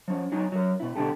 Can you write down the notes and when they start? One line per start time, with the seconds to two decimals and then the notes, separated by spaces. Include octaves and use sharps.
0.08 F3 C#4
0.32 F#3 D#4 G#5
0.52 F#3 A#4
0.80 B2 E4
0.95 B2 D3 G4 A4